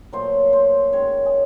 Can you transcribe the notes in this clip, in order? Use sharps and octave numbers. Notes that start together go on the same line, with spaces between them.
A#2 F#3 A3 C5
C5
D#3 G#3 C#4 C#5
G#4